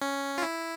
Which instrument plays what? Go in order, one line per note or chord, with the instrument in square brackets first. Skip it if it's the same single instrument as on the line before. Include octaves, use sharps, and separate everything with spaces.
[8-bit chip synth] C#4
F4
E4